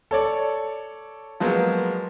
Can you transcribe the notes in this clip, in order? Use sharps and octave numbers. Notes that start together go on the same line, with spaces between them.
A4 C#5 D5
F3 F#3 G#3 A#3 B3